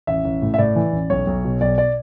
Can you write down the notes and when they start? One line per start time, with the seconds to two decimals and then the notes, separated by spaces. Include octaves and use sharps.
0.07 A1 E5
0.25 A1
0.42 A2
0.54 E5
0.58 A2 D5
0.76 E3
0.93 A1
1.10 B1 C#5
1.27 B1
1.44 B2
1.61 B1 D5
1.78 D5